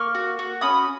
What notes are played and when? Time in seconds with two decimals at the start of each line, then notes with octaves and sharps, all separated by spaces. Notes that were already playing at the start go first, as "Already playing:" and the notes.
Already playing: A#3 C#6 F6
0.15 F#4
0.39 F#4
0.61 C#4 B5 D#6